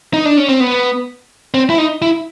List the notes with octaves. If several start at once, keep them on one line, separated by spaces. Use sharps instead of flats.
D#4
D4
C#4
C4
B3
C4
E4
D#4
E4